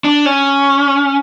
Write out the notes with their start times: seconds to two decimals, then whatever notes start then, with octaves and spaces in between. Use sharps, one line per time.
0.04 D4
0.26 C#4